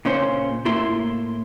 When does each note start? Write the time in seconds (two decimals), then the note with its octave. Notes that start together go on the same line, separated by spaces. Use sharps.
0.05 A#2 C#3 C#4 C5
0.65 A2 A#3 E4 C6